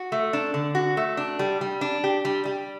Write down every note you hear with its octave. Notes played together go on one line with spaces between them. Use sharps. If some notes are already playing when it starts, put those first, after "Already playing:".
Already playing: F#4
A3
D4
D3
F#4
A3
D4
G3
G3
D4
G4
G3
G3